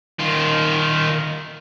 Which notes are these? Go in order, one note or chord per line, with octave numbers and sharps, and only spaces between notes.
D#3 F4